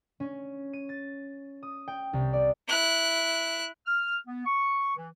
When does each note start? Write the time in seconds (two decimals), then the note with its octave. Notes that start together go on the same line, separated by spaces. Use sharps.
0.20 C#4
0.73 D#7
0.89 A6
1.63 D#6
1.88 G5
2.13 C2
2.33 D5
2.68 E4 F#6
3.86 F6
4.27 B3
4.46 C#6
4.97 E3